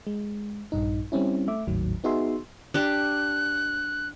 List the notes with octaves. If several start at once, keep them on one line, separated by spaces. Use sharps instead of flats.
G#3
A#1 G2 D#4
G3 C4 C#4 E4
A3 E5 D6
G#1 D#2 A2 D#3 F#3
B3 D#4 F#4 G#4 E5 C6
D4 G4 F#6